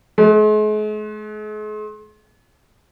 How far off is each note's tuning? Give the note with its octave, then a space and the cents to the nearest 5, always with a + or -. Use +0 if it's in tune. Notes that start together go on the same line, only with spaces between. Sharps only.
G#3 +45